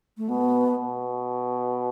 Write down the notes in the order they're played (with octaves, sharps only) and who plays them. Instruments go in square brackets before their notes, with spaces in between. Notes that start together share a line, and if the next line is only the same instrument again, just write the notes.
[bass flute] A3
[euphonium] B2 [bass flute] B3
[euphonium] B2